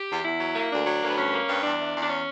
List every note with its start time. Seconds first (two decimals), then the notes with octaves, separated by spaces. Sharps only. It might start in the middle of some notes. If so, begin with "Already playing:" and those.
Already playing: G4
0.10 E2
0.24 E2 E4
0.40 F#3
0.56 A#3
0.71 D2 D4
0.86 F#3
1.00 D2 A#3
1.08 B3
1.17 G2 C#4
1.32 A#3
1.48 G2
1.63 E2 D4
1.79 E3
1.94 E2
2.01 D4
2.09 C#4